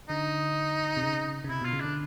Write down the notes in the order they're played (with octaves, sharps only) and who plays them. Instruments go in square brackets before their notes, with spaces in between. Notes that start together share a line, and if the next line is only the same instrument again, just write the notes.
[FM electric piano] D3 [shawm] D#4
[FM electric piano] C3
C#3
C#3
[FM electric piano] C3 [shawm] E4
[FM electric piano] B2 [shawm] F4
[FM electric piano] C#3
[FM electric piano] D3 [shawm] D4